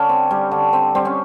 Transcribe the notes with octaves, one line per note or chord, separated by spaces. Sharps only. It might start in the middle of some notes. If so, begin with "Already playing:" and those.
Already playing: D3 C#4
C4
G3
D3
C4
G3 C4
C#4